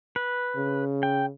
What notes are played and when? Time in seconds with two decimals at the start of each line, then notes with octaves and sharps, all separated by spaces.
0.16 B4
0.56 C#3
1.03 G5